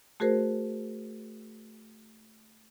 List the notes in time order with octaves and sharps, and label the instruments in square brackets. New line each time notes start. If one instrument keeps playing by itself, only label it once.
[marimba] A3 F#4 G#4 A#4 C5